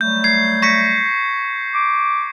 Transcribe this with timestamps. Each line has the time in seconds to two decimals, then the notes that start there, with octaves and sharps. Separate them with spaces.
0.01 F#3 G3 A3 G6
0.24 G#6 C7
0.62 C#6 A#6 B6 C#7
1.73 D6